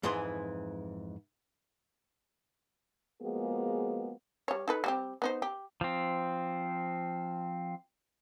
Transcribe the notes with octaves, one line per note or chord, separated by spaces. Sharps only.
F2 G#2 E3 E4 G#4 C6
F3 G#3 A#3 B3 F#4 G#4
G3 C#5
D#4 A4 B4
G3 C4 G4
B3 D#4 C5
G4
F3 C4